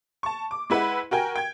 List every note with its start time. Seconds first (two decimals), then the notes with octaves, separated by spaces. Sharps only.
0.23 A5 C#6
0.51 D6
0.70 G#3 E4 B4 F#5
1.11 F#4 A#4 G5 G#5
1.36 G5 G#6